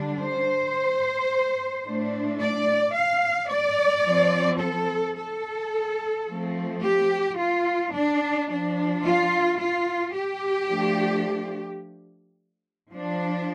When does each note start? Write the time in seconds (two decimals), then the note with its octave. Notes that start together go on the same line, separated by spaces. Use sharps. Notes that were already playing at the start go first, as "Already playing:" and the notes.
Already playing: D3 G3 D4
0.20 C5
1.85 A2 A3 D4
2.41 D5
2.95 F5
3.50 D5
4.06 F3 C4
4.61 A4
5.17 A4
6.27 F3 A3 C4
6.83 G4
7.37 F4
7.93 D4
8.48 F3 D4
9.04 F4
9.59 F4
10.14 G4
10.69 F3 A3 D4
12.91 F3 D4